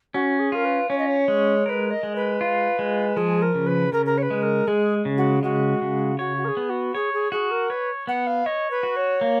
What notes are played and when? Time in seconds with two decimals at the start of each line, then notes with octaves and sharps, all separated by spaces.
0.14 C#4 F#4
0.39 G#4
0.52 F4 A#4
0.65 B4
0.89 C#4 C#5
0.98 D#5
1.07 C#5
1.28 G#3
1.66 A#4 B4 C#5
1.90 D#5
2.03 G#3
2.16 B4
2.41 F4
2.79 G#3
3.16 F3 G#4
3.42 A#4
3.55 C#3
3.67 B4
3.92 C#3 A#4
4.06 A#4
4.18 C#5
4.22 B4
4.30 G#3
4.43 A#4
4.68 G#3 G#4
5.05 C#3
5.17 F#4
5.43 G#3 F#4
5.82 C#3
6.19 F#4 C#5
6.37 F#4
6.45 A#4
6.48 G#4
6.57 B3
6.70 F#4
6.95 G#4 C#5
7.13 G#4
7.32 F#4 G#4
7.51 A#4
7.70 B4 C#5
8.07 B3 F#5
8.27 F5
8.46 C#5 D#5
8.71 B4
8.83 F#4
8.96 C#5
9.21 A#3